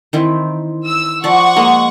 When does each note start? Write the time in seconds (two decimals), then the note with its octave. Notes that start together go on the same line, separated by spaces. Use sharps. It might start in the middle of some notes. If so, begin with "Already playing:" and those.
0.13 D#3 E3 C4
0.86 E6
1.24 F3 D5 F#5 C#6
1.56 G#3 A#3 D#5